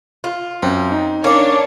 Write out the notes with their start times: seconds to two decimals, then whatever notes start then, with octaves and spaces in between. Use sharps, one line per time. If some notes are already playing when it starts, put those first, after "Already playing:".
0.24 F4
0.63 F#2 C4
0.92 D#4
1.24 A#3 C#4 D4 C#5 D5